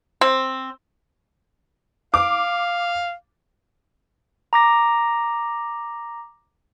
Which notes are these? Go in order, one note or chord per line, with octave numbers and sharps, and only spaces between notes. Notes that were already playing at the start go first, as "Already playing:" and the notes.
C4
F5 D6
A#5 D6 A#6